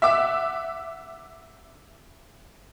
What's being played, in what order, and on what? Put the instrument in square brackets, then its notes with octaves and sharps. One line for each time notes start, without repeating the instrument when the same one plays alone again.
[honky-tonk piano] E5 F#5 D6 E6